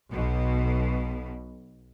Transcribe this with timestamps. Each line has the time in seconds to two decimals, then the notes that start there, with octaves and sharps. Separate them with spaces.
0.12 B1 B2